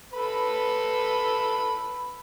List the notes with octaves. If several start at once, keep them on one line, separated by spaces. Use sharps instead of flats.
A4 B4 B5